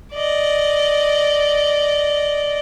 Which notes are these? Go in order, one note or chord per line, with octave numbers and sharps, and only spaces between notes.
D5 D#5